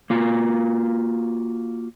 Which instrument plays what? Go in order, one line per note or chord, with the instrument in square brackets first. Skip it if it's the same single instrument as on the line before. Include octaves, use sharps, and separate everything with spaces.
[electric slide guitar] A#3 F4 F#4